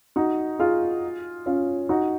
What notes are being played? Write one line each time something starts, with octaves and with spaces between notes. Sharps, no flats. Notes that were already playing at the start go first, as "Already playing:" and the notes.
D#4 F#4
F4 G#4
C#4 F4
D#4 F#4